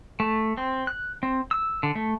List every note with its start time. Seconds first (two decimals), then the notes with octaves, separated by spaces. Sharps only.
0.20 A3
0.57 C4
0.87 F#6
1.23 C4
1.51 E6
1.83 D3
1.95 A3